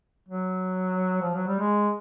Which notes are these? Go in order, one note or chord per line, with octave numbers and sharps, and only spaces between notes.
F#3
F3
F#3
G3
G#3